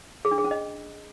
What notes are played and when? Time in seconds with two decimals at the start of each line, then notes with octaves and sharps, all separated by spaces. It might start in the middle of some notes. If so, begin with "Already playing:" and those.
0.25 G#4
0.31 D4
0.38 G#4
0.44 C#4
0.51 D#5